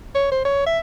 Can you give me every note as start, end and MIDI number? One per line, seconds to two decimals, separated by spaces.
0.15 0.30 73
0.31 0.40 72
0.45 0.62 73
0.66 0.79 76